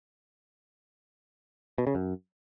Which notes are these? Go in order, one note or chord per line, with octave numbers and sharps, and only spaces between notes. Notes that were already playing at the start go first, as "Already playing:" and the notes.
B2
C#3
F#2